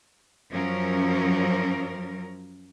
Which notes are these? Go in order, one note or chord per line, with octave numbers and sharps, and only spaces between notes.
F#2 F3 F#3 C#4 A#4